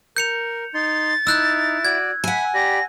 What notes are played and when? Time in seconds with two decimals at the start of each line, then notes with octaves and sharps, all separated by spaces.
0.16 A#4 G6 C#7 F7
0.74 D#4 C6 A6
1.27 D#4 E4 E6 F#6 G6
1.85 F#4 D5 G#6
2.24 E5 F#5 G#5 B5
2.54 G4 D5 B5 A#6